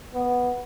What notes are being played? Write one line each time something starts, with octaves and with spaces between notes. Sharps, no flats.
B3